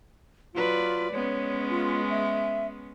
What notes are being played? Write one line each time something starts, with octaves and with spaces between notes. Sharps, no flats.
F#3 F4 B4 D5
G#3 B3 C#4 C#5
F4
E5